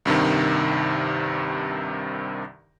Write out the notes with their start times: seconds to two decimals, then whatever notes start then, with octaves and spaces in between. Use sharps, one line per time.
0.05 C2 G2 C3 D#3